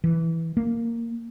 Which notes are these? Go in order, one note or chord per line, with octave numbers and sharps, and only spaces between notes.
E3
A#3